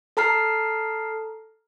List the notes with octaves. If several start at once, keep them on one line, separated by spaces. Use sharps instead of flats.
A4 A5 A#5 F6 C7